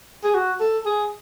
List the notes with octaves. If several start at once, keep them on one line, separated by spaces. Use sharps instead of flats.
G#4
F#4
A4
G#4